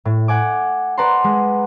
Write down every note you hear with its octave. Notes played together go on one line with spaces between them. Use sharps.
A2
F#5 G#5 D6
B4 D5 F#5 A5 A#5 C6
G#3